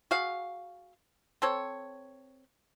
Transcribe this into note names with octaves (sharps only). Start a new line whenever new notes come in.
F#4 G#4 F5
C4 A4 C#5